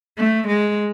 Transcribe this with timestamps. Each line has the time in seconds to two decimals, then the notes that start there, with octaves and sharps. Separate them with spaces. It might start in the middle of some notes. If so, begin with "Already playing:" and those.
0.16 A3
0.47 G#3